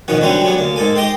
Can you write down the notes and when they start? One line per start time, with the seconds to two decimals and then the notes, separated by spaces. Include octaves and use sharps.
0.08 B2 D#3 F3 C#4 F#4
0.21 D3 E3 F#3 G3 C4 G4
0.42 F#3 G3 B3 C#4
0.58 D2 A#3
0.76 G#2 A#3 A4 G#5
0.96 G4 D#5 G5 C6